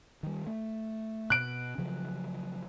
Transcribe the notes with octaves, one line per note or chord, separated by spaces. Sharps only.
D#3 G3
A3
B2 F#6 D7
C#3 F3 F#3